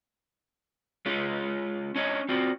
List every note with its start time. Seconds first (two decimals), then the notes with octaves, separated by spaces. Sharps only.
1.06 G#3 C#4 F4
1.96 C#4 D4 C#5 D#5
2.29 C4 F4 F#4 D5